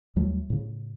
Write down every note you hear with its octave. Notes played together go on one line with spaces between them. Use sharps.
D#2 F#3 G3 A3
A2 C#3